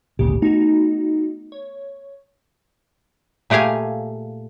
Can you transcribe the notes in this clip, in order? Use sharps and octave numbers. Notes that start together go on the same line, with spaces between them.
G#1 D2 A#2 C#3 G4
A3 B3 D#4 F#4
C#5
A#2 A3 G4 G#4 F5 G#5